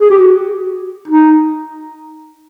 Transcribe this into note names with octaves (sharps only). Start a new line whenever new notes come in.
G#4
G4
F#4
D#4